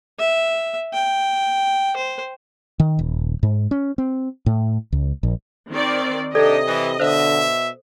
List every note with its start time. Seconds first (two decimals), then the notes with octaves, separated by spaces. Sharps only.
0.19 E5
0.94 G5
1.96 C5
2.80 D#3
2.99 D#1
3.43 G#2
3.71 C#4
3.98 C4
4.46 A2
4.92 C#2
5.23 A#1
5.71 D#3 C4 D5
6.35 C3 D4 D#4 G4 A4 D5 D#5
6.67 E3
7.00 B2 D3 C5 E5